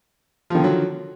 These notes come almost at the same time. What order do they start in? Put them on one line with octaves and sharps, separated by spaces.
F3 D#3 D3 F#3